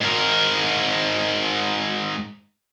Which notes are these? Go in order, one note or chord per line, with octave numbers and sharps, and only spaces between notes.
G#2 A#4